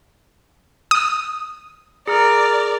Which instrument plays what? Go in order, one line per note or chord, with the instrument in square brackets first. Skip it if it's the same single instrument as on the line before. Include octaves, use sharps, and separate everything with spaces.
[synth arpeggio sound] D#6
[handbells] G#4 A#5 F6 [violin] A#4 D5